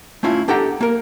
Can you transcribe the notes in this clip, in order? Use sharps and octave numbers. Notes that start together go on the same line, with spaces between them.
A3 C#4 E4 F4
D4 G4 A4 F#5 A#5
A#3 A#4